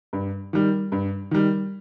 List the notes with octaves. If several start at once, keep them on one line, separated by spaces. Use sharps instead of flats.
G2
D#3 G3
G2
D#3 G3